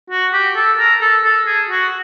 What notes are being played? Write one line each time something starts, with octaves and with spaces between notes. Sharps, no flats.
F#4
G4
A4
A#4
A4
A4
G#4
F#4